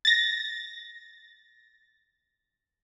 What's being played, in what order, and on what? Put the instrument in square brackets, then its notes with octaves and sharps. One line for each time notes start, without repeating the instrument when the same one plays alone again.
[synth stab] A6 A#6